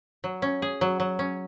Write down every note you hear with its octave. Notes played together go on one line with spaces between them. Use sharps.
F#3
C#4
G#4
F#3
F#3
C#4